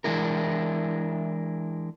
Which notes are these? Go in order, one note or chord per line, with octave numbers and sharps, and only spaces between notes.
E3 G#3 D4 E4 A#4